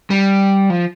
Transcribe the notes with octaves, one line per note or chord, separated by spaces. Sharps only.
G3
F3